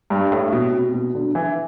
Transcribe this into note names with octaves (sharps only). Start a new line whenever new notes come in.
G2
A2
B2
C3
B2
D3
E3